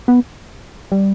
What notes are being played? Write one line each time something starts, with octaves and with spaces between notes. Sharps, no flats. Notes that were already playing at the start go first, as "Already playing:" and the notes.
B3
G3